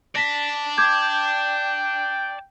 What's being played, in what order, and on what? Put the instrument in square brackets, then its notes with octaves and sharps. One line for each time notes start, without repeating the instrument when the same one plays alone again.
[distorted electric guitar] D5 A5 [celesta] A#6 B6
[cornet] G5 [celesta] D6 G6 G#6